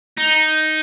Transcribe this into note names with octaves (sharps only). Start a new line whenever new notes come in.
D#4